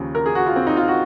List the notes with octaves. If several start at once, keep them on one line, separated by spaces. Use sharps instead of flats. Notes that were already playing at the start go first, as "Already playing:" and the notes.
Already playing: D#2 C#3 F3
A#4
G#4
F#4
F4
C4
D#4
F4
F#4